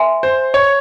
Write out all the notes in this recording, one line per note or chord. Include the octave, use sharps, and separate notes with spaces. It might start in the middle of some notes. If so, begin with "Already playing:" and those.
Already playing: B4 E5 G#5 C6
C5
C#5